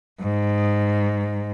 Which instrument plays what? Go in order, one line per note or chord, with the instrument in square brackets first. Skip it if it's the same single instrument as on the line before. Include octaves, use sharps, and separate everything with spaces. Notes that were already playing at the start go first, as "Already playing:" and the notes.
[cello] G#2